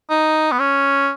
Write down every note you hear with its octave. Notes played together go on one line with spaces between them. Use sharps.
D#4
B3
C#4